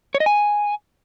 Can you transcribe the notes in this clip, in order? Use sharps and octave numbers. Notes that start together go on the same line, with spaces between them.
C#5
D#5
G#5